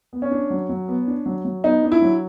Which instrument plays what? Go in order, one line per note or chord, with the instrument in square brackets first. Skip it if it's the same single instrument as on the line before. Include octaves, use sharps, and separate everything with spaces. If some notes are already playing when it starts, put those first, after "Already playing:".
[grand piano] B3
[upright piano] C#4
[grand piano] D4
F#3
F#3
B3
D4
F#3
F#3
[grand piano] B3 [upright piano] D#4
[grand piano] D4
[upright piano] E4
[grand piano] F#3